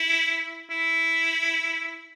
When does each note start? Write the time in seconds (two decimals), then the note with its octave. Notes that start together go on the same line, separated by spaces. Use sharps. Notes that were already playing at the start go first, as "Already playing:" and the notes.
Already playing: E4
0.70 E4